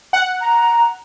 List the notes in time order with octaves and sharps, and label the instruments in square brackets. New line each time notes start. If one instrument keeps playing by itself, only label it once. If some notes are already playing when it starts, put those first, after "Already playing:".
[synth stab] F#5
[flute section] A#5